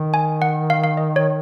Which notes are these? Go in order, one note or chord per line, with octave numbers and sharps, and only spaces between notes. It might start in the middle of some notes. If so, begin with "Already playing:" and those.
Already playing: D#3
G#5
F#5
F5
F5
D#5
C#5